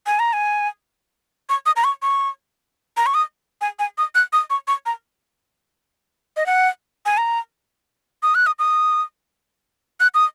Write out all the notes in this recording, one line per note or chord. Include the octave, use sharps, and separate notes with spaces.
G#5
A#5
G#5
C#6
D#6
A#5
C#6
C#6
A#5
C#6
D#6
G#5
G#5
D#6
F#6
D#6
C#6
C#6
A#5
D#5
F#5
G#5
A#5
D#6
F#6
D#6
D#6
F#6
D#6